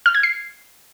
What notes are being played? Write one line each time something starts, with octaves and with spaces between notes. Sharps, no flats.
F6
G#6
C7